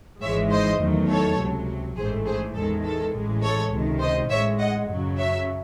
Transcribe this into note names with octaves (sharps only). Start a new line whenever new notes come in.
G#1 G#2 E3 G#3 C#5 E5
C5 D#5
E2 D#3 F#3 A3
A4 C#5
C#2 C3 F#3
A1 G#2 E3 A3 G#4 C5
G#4 C5
E2 D#3 G#3 A4
A4
A1 A2 E3 G#3
A4 C#5
C#2 C3 D#3
C5 D#5
A1 A2 G#3 C#5 E5
D#5 F#5
F#2 C#3 F#3
C#5 E5